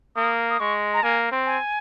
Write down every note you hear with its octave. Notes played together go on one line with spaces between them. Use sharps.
A#3 D#6
D#6
G#3 C#6
A#5
A#3 G#5
C4
G#5